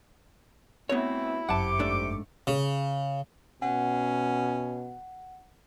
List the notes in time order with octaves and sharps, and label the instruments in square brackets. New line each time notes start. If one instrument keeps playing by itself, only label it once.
[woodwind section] E3 A3 C4 [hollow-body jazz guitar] B3 F#4 C#5 [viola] E4
[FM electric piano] G1 F#2 C#7 [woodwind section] C3 G4 D6 [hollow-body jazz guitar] F#5 A5
[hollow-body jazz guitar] G#2 A3 D4
[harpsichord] C#3
[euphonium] B2 [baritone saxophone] C#4 [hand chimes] F#5